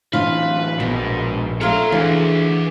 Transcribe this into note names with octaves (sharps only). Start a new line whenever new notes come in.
A2 D3 E3 F4 B4
A#1 G#2 B2
A3 F4 A#4 C#5 A#5
D2 E3 F4 G#4